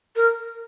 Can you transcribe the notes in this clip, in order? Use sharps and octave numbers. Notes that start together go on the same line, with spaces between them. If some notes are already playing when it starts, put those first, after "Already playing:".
A#4